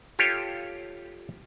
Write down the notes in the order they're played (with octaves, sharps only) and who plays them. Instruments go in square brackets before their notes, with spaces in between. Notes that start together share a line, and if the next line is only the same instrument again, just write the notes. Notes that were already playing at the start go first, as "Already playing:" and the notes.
[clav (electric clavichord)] F4 G4 A4 C#5